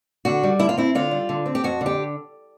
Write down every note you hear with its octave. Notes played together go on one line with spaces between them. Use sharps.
D3 F#4
G3
D3 E4
F4
C4 E4
D3 F4
G3
D3
C4
G4
F2 F#4
D3
G4